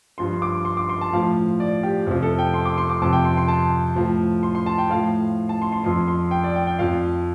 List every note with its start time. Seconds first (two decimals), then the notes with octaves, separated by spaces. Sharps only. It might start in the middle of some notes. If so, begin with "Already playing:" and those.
0.18 G2 F3 C6
0.42 D6
0.65 C6
0.77 D6
0.89 C6
1.01 A5
1.13 A2 F3 F5
1.60 D5
1.83 G4
2.07 F2 C3 F3
2.23 A4
2.39 G5
2.54 C6
2.65 D6
2.78 C6
2.90 D6
3.02 F2 C3 F3 A5
3.13 G5
3.25 C6
3.37 C6
3.48 A5
3.96 A2 F3
4.43 C6
4.55 C6
4.66 A5
4.78 G5
4.90 A2 F3 F5
5.49 A5
5.62 C6
5.72 C6
5.84 F2 F3 C6
6.08 C6
6.31 G5
6.44 D5
6.55 G5
6.67 G5
6.79 F2 F3 F5